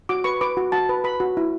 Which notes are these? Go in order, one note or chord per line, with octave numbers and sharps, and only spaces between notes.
F#4 D6
B4 C#6
B4 D6
F#4
F#4 A5
B4
B4 B5
F#4
E4